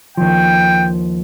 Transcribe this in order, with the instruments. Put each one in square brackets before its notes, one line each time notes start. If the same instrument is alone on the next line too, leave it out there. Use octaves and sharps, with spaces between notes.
[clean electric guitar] D#2 F3 [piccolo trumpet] G5